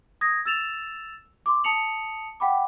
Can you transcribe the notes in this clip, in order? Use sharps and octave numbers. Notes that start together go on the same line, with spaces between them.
D#6 G#6 A#6
E6 A6 E7 F7
C6 D6
A5 D#6 C#7 F7 F#7
F#5 G5 B5 D6